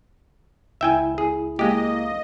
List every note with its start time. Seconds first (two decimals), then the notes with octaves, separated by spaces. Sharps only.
0.81 C#2 E4 E5 G5 G#5
1.18 G#4
1.59 G#3 A#3 G4 D#5